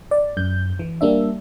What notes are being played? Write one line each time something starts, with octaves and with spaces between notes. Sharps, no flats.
D5
F#2 G6
E3
G3 A#3 D4 E5